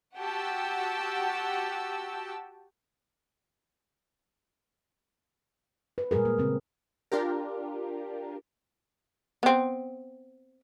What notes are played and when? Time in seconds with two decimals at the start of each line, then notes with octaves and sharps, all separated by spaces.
0.16 F#4 G4 F#5 G5 A5 E6
5.98 B4
6.11 A#2 G3 G#3 G#4 A#4
6.25 A#3
6.38 C#3 C4
7.12 D4 F4 G4 A#4
9.43 B3 C4